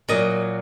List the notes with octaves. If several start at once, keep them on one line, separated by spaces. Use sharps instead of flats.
A#2 F#3 D#5